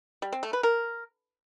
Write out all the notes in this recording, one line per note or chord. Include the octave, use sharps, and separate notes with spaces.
G3
C4
A3
B4
A#4